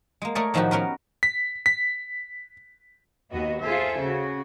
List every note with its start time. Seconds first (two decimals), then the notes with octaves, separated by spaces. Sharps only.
0.22 G#3 A#3
0.35 A3 G#4 A#4 C#5 D5
0.54 A2 D#3 F3 D#4 F#4 G4
0.71 B3 C#4 A#4 B4
1.23 B6
1.66 B6
3.31 D#2 B3 F#4 D#5
3.62 F4 G#4 A4 C5 E5
4.00 C#3 F#4